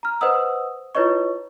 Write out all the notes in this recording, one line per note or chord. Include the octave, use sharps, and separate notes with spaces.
A#5 F6
B4 C5 D#5 F#5 D#6 E6
E4 F4 B4 C#5 D#5 C#6